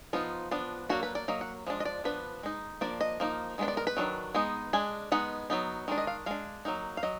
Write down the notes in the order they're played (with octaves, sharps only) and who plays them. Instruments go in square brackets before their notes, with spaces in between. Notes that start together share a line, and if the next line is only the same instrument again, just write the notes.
[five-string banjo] F3 B3 D#4 F4
F3 B3 D4
F#3 A#3 D4 F#4
B4
D5
F#3 A#3 D#5
F#5
F3 G#3 D4
D#5
D5
F3 B3 D4 B4
G#3 D#4
F3 A#3 D4 D5
D#5
F3 A#3 D#4
D#3 G#3 B3 D4
D5
A#4
B4
D#3 F#3 D4
G#3 B3 D#4
G#3 D4 G#5
G#3 B3 D#4 F#5
F#3 B3 D#4
D#3 G#3 D4
D#5
F5
G#3 D4 F5
F#3 A#3 D#4
F5
F#3 D#5